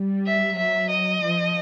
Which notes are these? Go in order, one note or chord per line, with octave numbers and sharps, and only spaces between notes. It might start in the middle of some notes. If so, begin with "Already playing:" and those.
Already playing: G3
E5
F#3 E5
D#5
F3